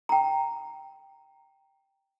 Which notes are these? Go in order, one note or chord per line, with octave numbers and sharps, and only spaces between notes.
G5 A#5